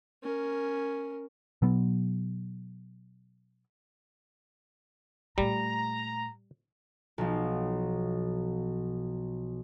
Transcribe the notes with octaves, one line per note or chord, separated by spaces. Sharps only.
C#4 A#4
B2 F#3 B3
A#2 G3 A3 A#5
B1 F3